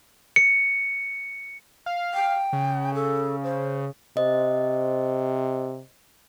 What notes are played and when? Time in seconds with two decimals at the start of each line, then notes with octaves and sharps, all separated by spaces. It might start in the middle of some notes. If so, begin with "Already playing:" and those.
0.36 C#7
1.86 F5
2.14 G5
2.53 C#3
2.95 A4
3.43 C5
4.17 C3 C5 D#5